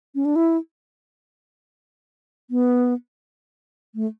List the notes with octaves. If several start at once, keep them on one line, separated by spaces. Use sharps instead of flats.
C#4
D4
E4
B3
A3